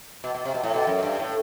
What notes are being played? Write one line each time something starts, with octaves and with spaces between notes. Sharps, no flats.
B2
B2
C3
B2
A2
B2
F#2
G2
A2